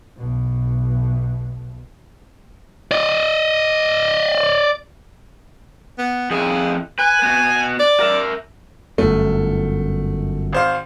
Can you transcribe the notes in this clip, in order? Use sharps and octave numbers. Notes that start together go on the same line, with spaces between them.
B1 B2
D5 D#5
B3
F2 E4 G#4
B4 G#5
B3 F#4
D5
A#4 E5
G1 F#2 A3
G#1 C5 F5